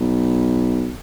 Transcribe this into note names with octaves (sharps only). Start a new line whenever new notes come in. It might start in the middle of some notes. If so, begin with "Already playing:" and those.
B1